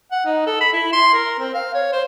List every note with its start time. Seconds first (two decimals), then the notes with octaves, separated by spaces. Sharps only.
0.11 F#5
0.25 D#4
0.47 A4
0.61 B5
0.73 E4
0.93 C6
1.14 A#4
1.39 C4
1.54 F5
1.74 C#5
1.93 C5